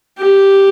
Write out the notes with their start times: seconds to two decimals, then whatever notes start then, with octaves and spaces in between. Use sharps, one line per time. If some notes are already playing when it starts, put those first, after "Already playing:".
0.18 G4